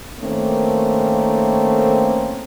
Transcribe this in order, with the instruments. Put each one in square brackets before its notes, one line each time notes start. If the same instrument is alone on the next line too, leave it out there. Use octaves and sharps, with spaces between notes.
[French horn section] D#3 A3 A#3 C4 C#4